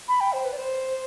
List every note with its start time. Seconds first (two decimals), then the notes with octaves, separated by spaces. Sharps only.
0.08 B5
0.21 G5
0.33 C5
0.45 B4
0.53 D5
0.57 C5